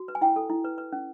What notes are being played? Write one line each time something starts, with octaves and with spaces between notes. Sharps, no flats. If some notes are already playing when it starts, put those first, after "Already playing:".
Already playing: F#4
B4
G#5
E4 G5
A4
E4
B4
B4
C#4